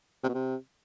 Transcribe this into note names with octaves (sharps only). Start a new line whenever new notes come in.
C3
B2
C3